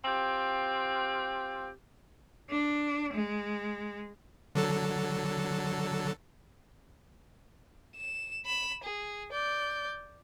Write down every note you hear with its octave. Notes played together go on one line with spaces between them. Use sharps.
C4 F4 G4
D4
G#3
D3 F#3 A4
E7
B5 E7
G#4
D5 G6